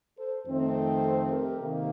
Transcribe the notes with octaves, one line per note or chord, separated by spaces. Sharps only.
A4 C5
F2 D#3 A3 C4
A4 C5
A4 C5
G4 A#4
C3 D#3 A#3